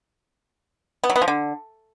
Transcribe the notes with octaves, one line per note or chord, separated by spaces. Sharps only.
B3
F#3
B3
F3
D3